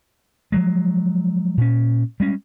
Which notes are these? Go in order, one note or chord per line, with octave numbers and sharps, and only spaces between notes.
F3 F#3 G#3
A#2 C#4
G3 G#3 C#4